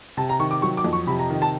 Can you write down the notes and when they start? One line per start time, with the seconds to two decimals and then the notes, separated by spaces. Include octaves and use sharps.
0.17 C3 A5
0.29 A#5
0.39 D#3 C#6
0.51 D6
0.62 F#3 C#6
0.77 D6
0.84 F2
0.93 C#6
1.07 C3 B5
1.19 A#5
1.30 D#3
1.42 A5